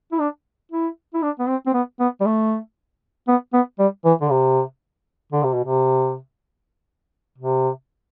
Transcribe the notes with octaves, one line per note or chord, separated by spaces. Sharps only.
E4
D4
E4
E4
D4
B3
C4
C4
B3
B3
G3
A3
B3
B3
G3
E3
D3
C3
D3
C3
B2
C3
C3